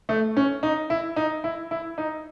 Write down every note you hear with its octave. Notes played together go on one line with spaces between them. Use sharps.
A3
C#4
D#4
E4
D#4
E4
E4
D#4